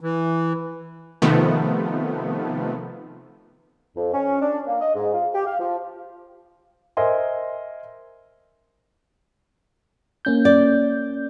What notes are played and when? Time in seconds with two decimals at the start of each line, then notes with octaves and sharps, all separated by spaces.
0.01 E3
1.22 C3 D#3 F3 A3 B3
3.96 F2
4.13 C#4
4.42 D4
4.67 A#3
4.81 D#5
4.95 G#2
5.14 F4
5.34 G4
5.46 F5
5.60 F3
6.97 A#4 C5 D#5 E5 G#5 C6
10.25 A#3 C#4 G6
10.45 D5